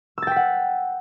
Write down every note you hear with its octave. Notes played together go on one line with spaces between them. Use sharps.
F#5 G5 E6 A6 B6